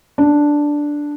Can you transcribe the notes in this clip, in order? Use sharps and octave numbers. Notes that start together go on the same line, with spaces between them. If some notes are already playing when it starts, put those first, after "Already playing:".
D4